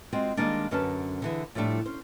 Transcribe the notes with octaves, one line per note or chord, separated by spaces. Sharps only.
G#3 C4 F4 F#4
D#3 G3 G#3 A#3 D4
F#2 D3 C#4 F#4 B4 A5
D3 E3 G#4
A2 F3 G3 A3 D4
C#4 C5